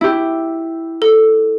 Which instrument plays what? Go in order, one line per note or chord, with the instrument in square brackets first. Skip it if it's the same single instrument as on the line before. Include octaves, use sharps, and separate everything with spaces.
[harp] E4 G4
[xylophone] A4